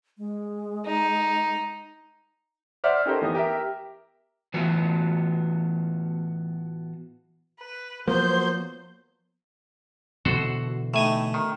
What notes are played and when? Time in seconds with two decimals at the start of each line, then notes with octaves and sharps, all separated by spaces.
0.18 G#3
0.86 D#4
2.84 C5 D5 E5 F#5 F6
3.06 C#4 D#4 G4 A4 A#4 C5
3.22 E3 B3 D#4 D#5
3.35 G4 A#4 E5
4.54 A2 E3 B3 F4 F#4
7.60 B4
8.08 F3 F#3 A#3 B3 C5 G6
10.25 B2 D3 E3 F#4 A4 C5
10.94 A2 A3 D#4 G#5
11.34 D#3